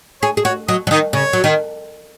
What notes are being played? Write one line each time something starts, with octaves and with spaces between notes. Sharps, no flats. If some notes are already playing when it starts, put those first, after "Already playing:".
G#4 C#5
G#4
F#4 C#5
F#3 D#5
F#3
D#3 D#5
C#3 C#5
F#3
D#3